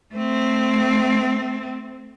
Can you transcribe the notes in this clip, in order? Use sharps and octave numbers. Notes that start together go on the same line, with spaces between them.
A3 C4